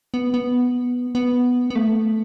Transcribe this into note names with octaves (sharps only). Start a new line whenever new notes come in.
B3
B3
B3
B3
A3